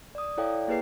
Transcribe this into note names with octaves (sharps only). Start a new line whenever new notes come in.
D5 D#6
E4 A4 C#5 D5 F5 G5
A#3 E4 G#4 B4 G5 C7